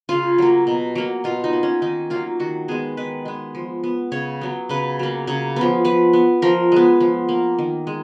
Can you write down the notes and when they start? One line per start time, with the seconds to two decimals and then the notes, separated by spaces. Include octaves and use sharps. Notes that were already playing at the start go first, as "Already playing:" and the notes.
0.09 C#3 F4
0.38 F#3 A#3
0.67 B2
0.95 F#3 A#3
1.24 B2 F4
1.44 D#4
1.53 A#3
1.63 C#4
1.82 D#3 D#4
2.10 F#3 A#3 F4
2.40 D#3 F#4
2.68 G#3 B3 G#4
2.97 D#3 B4
3.25 G#3 B3
3.55 F3
3.84 B3
4.12 C#3 C#5
4.41 F#3 B3
4.69 C#3 B4
4.99 F#3 A#3
5.27 C#3 C#5
5.56 F3 B3
5.85 F3 B4
6.13 B3
6.42 F3 A#4
6.72 G#3 B3
7.00 F3
7.29 A#3
7.58 D#3
7.87 G#3